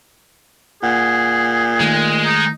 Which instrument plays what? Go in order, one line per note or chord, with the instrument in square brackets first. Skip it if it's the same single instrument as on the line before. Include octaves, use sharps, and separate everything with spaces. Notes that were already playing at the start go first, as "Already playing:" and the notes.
[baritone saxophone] A#2 [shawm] G#4 [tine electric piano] F#5
[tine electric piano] D#3 A3 [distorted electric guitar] G#3
[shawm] D#4